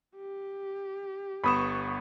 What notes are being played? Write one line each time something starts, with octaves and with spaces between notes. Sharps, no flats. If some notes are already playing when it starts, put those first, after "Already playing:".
G4
G1 B3 B5 C#6 D#6 E7